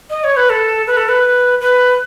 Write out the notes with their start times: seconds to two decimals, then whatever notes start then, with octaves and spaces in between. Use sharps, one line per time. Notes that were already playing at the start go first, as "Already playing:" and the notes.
0.10 D#5
0.24 C#5
0.37 B4
0.50 A4
0.87 B4
0.97 A4
1.09 B4
1.61 B4